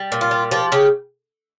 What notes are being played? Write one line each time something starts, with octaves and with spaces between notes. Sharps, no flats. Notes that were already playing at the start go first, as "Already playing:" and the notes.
Already playing: G3
A#2
F4
G3
F3 G4
C#3 G4